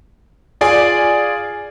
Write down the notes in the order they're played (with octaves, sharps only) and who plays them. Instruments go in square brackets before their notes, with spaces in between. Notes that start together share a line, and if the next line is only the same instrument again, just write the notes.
[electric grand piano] F4 G#4 D5 G#5